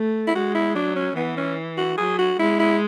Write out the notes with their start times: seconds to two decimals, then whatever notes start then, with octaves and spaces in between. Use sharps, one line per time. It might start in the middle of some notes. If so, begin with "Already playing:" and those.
Already playing: A3
0.27 E4
0.35 G#3 F#4
0.55 E4
0.75 F#3 D4
0.96 C#4
1.16 E3 B3
1.37 C#4
1.78 F#4
1.97 F#3 G#4
2.19 F#4
2.39 G#3 E4
2.59 E4